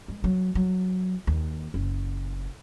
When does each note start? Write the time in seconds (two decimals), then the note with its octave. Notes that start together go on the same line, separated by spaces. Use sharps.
0.08 G#3
0.24 F#3
0.55 F#3
1.27 D#2
1.74 F#1